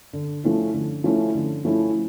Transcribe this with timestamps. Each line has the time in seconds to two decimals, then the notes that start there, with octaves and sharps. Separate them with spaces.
0.13 D3
0.44 F3 A3 C#4 E4
0.74 D3
1.04 F3 A3 C#4 E4
1.35 D3
1.65 F3 A3 C#4 E4